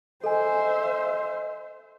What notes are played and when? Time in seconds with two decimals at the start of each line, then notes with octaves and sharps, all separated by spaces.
0.24 A4 C5 D#5 E5 G#5